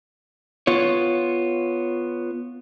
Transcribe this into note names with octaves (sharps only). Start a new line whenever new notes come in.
B3 F4 C#5